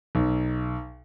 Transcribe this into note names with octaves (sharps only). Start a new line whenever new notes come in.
B1